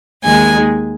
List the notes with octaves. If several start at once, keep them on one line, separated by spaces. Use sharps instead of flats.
D#2 D#3 G#3 G#5